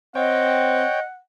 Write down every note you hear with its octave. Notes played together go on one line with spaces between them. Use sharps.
C4 C#5 D#5 F#5 G5